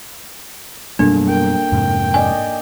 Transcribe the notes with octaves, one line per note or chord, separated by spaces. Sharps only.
F#2 B2 G3 A#3 D4 A4
A#4 G5
F2 G#2 C3
D4 D5 D#5 G#5